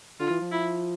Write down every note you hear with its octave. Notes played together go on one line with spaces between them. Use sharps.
D3 F4
E3
F3
E4